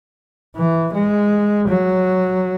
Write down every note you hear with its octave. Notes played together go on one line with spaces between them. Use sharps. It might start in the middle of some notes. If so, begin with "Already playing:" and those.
E3
G#3
F#3